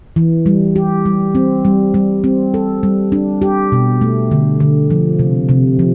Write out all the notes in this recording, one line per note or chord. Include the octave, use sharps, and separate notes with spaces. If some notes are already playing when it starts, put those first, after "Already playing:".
E3
G3
G4
G3
C4
G3
G3
C4
A4
G3
D4
G4
B2
A3
D3
D3
F3
C3
C3
F3